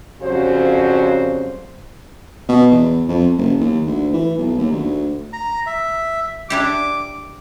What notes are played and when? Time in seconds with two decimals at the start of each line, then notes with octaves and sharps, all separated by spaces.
0.22 F2 C#3 F#3 G3 F#4 C5
2.49 B2
2.71 E2
3.08 F2
3.38 F#1
3.61 D#2
3.87 D2
4.14 E3
4.38 B1
4.58 D#2
4.72 D2
5.33 A#5
5.66 E5
6.50 D4 E4 G4 D6